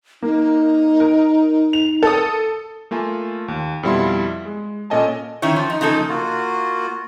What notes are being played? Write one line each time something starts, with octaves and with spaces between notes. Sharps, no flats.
A#3 D#4
A#4
F7
A4 D#6
A3 A#3 F4 G#5
D#2
F2 B2 G3 E4 F5 C6
G#3
A#2 C#4 A4 D#5 G#5 A5
D#3 C#4 E4 C#5
F3
D#4
C#3 F3 A#3 D#4 A4
A#3 F4 F#4